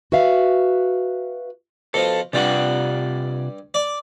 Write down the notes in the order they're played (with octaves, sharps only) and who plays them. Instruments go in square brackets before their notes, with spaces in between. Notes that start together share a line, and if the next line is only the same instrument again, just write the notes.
[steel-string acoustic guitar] F#4 B4 E5 F5
[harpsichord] B2 F3 [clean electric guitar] A4
[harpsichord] G2 G3 [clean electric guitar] C3 F4 F#5
[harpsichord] D5